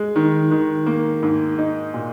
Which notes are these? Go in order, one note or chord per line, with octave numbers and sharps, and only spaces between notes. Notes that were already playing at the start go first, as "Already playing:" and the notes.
Already playing: G#3
D#3
D#3
A#3
G#2
D#4
A#2